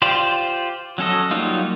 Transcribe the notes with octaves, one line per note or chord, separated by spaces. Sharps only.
F4 G4 C5 D5
F#3 C#4 A4 D#5
F#3 G3 A#3 D#4 F4